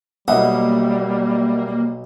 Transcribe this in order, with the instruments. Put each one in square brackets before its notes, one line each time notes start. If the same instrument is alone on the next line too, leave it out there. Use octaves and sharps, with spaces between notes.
[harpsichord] B1 D#6 [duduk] G3 [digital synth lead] A#3 [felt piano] D#5 E5 F#5